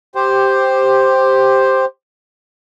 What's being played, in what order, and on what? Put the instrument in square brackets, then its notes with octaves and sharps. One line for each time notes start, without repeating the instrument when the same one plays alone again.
[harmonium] G4 C5